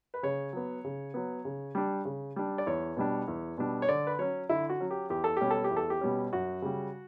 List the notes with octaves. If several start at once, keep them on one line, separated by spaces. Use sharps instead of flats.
B4
C#3 C#5
F#3 B3
C#3
F#3 B3
C#3
G3 D4
C#3
G3 D4
D5
E2 C#5
B2 G3 D4
E2
B2 G3 D4
C#5
D3 D5
B4
F#3 C#4 C#5
D3 E4
F#4
F#3 C#4
G4
E2 G4
A4
B2 G3 C#4 G4
A4
G4
E2
A4
G4
B2 G3 C#4
F#2 F#4
C#3 G3